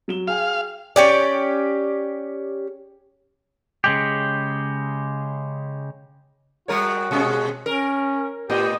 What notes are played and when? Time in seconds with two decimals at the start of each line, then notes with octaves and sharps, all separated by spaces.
0.08 F#3 E7 G7
0.28 G#4 F5 G5 G#5
0.96 C#4 G4 D5
3.84 C#3 G#3 G4
6.68 G3 F#4 A#4 C#5
7.11 B2 G#3 C#4
7.66 C#4 A#4
8.50 A2 B3 G4 D#5